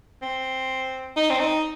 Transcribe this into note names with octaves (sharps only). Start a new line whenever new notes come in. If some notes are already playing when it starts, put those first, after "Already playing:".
C4
D#4
C4
D#4